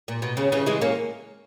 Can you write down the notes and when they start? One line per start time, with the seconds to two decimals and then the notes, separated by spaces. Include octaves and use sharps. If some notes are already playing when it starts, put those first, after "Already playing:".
0.08 A#2
0.22 B2
0.37 C#3
0.52 C#3 E3
0.66 E3 G#3
0.81 A#3 C#4